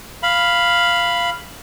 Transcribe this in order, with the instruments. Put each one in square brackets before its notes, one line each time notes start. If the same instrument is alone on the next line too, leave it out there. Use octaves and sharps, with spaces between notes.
[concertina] F5 B5